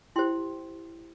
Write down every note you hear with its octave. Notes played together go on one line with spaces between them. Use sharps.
E4 G4 C5 G5 C6